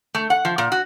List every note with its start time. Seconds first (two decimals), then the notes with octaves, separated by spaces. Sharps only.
0.15 A3
0.30 F#5
0.45 F3
0.58 A#2
0.72 F#4